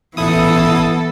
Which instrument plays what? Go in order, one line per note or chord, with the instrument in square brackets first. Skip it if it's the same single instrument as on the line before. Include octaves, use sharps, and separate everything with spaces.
[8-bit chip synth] A1 E4 D#6 [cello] E3 A4 [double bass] B3